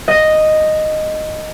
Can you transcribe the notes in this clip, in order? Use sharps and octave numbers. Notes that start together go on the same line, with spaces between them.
D#5